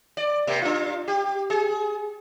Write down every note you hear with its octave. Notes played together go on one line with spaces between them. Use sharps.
D5
C3 A#3
D4 F4
G4
G#4